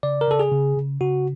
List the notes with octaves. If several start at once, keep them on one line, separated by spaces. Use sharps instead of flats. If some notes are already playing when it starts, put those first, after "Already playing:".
C#3 D5
A#4
C#3 A4
G#4
C#3
C#3
C#3 F#4